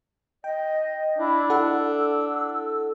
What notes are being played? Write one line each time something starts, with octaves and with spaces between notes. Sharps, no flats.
D#5 G5
D4 E4
E4 A4 F#5 E6